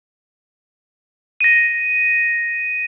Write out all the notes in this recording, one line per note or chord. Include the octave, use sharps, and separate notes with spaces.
A#6 D#7